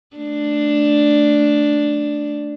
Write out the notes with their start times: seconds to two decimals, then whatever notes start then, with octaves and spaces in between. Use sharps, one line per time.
0.16 A3 D4